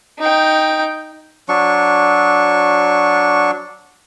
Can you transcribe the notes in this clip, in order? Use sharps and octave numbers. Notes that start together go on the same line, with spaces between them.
D#4 G5
F#3 D4 C#6